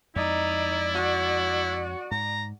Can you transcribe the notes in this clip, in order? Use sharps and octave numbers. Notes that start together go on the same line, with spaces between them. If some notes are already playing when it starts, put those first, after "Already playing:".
F2 G#3 D#4 E4 D5
F#4
G#2 A#5